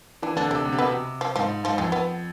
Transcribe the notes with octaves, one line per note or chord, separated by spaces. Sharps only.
E3 D4
D3 D4
C3 D4
D3
C3
B2 B3
C3
F3
G#2 F3
G#2 F3
F2 G#3
B3